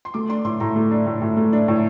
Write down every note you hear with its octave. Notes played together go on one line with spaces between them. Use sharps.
C6
A3 D6
D4 C6
A2 C6
A2 A#5
A3
D4
A2
A2
A3
D4
A2